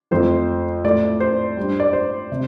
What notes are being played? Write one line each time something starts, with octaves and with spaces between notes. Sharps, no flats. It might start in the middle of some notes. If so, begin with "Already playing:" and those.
F2 F3 A3 C5
A2 A3 D5
C5
G2 G3
D5
C5
C3